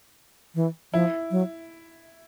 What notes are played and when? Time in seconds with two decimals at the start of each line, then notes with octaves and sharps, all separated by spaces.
0.55 E3
0.93 F3 E4
1.31 F#3